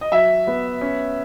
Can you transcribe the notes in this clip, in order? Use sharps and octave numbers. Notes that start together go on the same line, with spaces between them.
D#5
F#3 E5
B3
C#4